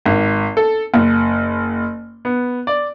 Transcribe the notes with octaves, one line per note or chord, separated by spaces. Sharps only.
G#1
A4
F#1
B3
D5